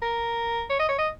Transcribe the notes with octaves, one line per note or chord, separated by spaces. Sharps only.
A#4
C#5
D#5
C#5
D#5